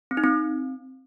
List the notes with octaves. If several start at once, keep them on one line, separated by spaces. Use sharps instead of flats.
C4
D#4
C4